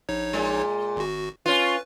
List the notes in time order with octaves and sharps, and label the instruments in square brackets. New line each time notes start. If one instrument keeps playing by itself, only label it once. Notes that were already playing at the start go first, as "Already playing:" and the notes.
[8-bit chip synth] A#1 D#4 C#5
[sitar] A#2 G#3
[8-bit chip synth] G#1 F#4
[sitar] C#4 F4 [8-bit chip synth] B4